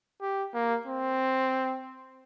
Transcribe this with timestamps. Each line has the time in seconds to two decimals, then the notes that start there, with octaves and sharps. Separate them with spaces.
0.21 G4
0.54 A#3
0.87 C4